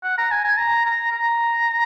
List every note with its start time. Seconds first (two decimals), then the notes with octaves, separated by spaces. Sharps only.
0.03 F#5
0.18 A#5
0.31 G#5
0.44 G#5
0.58 A#5
0.85 A#5
1.11 A#5